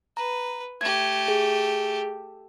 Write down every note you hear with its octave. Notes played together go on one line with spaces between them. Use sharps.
B4 A#5
A3 G4 G#6
G#4